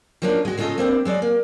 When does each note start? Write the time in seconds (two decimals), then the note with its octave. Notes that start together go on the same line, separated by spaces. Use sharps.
0.22 F3 F#3 A#3 C#4 D4
0.45 G#3 F#4
0.57 C#3 G#3 A3 F4 A4 D#5
0.78 A#3 C4 D4 G4
1.05 F#3 G#3 D5 D#5
1.22 A#3